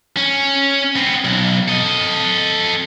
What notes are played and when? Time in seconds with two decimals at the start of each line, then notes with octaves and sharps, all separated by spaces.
0.17 C#4
0.96 B3 C4
1.24 B1
1.68 A4 D#5